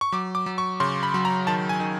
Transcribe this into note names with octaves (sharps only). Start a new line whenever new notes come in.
C#6
F#3 D6
D6
F#3
C#6
C#3 C6
B5
F#3
A#5
D#3 A5
G#5
D#3